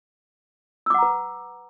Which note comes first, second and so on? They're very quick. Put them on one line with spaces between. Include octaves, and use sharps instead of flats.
E6 D6 F#5 A#5 B4